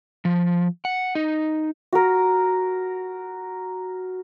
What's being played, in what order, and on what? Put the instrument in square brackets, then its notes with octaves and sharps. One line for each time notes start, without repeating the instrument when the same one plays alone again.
[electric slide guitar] F3
F#5
D#4
[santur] F#4 A#4